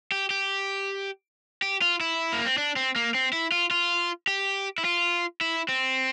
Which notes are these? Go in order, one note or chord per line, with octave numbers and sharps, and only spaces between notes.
G4
G4
G4
F4
E4
A#3
C4
D4
C4
A#3
C4
E4
F4
F4
G4
E4
F4
E4
C4